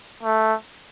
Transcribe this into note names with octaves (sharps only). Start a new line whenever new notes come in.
A3